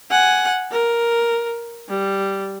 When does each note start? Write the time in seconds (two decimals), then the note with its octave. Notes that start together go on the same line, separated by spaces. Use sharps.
0.11 F#5 G#5
0.71 A#4
1.89 G3